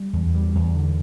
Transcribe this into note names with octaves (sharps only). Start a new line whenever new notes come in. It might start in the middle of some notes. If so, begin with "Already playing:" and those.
Already playing: G3
E2
G3
E2
D3